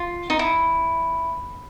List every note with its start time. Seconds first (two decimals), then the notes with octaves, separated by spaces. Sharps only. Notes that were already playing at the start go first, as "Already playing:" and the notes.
Already playing: F4
0.30 D#4
0.39 E4